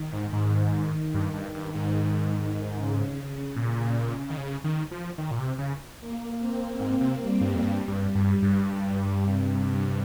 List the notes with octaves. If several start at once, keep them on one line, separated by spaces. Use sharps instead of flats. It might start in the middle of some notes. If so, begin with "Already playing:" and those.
Already playing: D#3
G#2
G#2
G2
G2
G2
G#2
C#3
A#2
D#3
C#3
D#3
F3
D#3
A#2
C3
C#3
A#3
C4
G#2 A#3
C3
G3
G2
F2
G2 G3
G2
G2
G2
C3